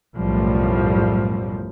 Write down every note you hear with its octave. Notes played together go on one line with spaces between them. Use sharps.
B1 F#2 A2 F3 G3